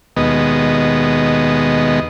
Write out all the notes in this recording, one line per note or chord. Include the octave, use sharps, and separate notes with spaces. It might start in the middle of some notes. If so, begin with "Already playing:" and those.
D#2 B2 G#3 B3 D#5